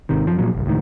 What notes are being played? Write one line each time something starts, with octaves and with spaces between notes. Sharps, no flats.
G#1 C3 D#3
F#2 F3
A#2 F3 F#3
G1 C2
C#2 A2 D#3